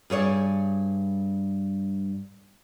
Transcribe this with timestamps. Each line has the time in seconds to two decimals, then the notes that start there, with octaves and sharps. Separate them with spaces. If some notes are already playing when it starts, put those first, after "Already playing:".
0.10 G2 G#4 C#5 D5